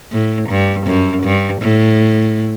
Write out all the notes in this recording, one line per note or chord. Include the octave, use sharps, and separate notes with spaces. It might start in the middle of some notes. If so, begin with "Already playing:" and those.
A2
G2
F#2
G2
A2